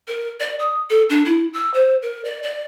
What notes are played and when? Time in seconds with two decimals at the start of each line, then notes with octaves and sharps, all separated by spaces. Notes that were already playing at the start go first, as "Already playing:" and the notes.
0.08 A#4
0.40 D5
0.59 D#6
0.90 A4
1.10 D4
1.25 E4
1.53 E6
1.74 C5
2.02 A#4
2.25 D5
2.43 D5